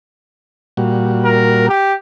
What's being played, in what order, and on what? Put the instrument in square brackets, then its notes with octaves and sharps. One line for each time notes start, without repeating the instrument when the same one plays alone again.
[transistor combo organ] A#2 G3 F#4
[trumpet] A#4
G4